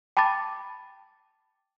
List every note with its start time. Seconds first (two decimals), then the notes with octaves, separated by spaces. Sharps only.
0.17 G5 A5 B5 D6 A6